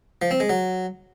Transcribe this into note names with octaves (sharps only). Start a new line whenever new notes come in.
F3
C4
G#3
F#3